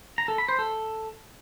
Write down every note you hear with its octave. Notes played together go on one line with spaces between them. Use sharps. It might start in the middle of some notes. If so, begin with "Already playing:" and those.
A#5
A4
B5
C5
A4